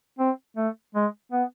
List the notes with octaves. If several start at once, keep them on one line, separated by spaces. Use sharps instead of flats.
C4
A3
G#3
B3